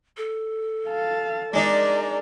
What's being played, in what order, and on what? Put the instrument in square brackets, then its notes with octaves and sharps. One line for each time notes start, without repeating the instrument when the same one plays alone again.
[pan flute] A4
[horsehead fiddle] F5 A5
[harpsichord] G#3 D4 D#4 [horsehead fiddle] A#4 D5